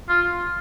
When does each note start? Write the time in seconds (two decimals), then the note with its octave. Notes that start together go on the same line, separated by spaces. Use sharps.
0.09 F4